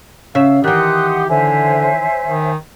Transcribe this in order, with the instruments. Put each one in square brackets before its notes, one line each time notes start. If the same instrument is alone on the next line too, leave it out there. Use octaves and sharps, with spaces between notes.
[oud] C#3 E5 [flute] F5
[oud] D#3 E3 [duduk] G4 [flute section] F#5 C6 D#6 [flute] F#6
[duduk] D3 [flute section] C5 C#5 E5 [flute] G#5
[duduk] D#3